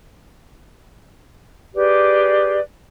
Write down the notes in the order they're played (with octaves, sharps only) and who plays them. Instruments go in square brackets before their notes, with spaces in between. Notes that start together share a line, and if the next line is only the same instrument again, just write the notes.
[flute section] G4 G#4 B4 D5